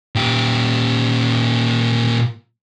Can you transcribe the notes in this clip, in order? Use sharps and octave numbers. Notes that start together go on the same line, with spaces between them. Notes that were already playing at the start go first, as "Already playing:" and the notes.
A#2 G4